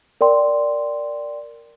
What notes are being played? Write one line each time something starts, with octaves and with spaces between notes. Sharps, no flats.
A#4 D5 G5 C6